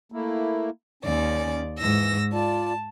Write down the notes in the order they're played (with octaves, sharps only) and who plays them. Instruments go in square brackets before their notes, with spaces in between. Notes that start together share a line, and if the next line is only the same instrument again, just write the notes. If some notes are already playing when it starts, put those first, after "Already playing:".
[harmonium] A3 A#3 E4
[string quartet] D#2 D5 [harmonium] C#4
[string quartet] G#2 E6 A#6 [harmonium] E3
[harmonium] F4 D5 [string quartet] A5